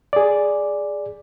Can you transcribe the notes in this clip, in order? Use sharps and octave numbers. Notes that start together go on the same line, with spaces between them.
G#4 D5